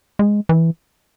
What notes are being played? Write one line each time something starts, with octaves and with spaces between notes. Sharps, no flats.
G#3
E3